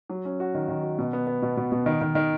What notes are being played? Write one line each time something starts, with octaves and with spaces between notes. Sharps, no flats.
F#3
C#4
F#4
D#3
D#3
F#4
B2
B3
B3
B2
B2
B2
D#3
D#3
D#3